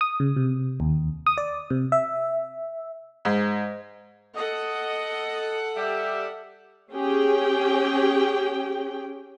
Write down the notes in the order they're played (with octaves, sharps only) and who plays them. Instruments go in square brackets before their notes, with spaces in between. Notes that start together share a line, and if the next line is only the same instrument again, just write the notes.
[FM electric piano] D#6
C#3
C3
D#2
D#6
D5
C3
E5
[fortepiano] G#2
[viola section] A4 F#5 [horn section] D#5
[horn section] G3 G4 E5
[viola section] C#4 G4 G#4 G5